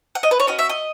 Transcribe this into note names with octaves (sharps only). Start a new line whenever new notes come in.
F#5
D#5
B4
C#5
C#4 F#4 D#5
E5
D#5